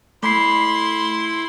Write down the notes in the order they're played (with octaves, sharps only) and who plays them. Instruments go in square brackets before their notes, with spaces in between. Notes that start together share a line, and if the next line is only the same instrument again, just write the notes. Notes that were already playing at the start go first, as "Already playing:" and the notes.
[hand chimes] A3 B5 C7 [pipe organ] E4 [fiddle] C6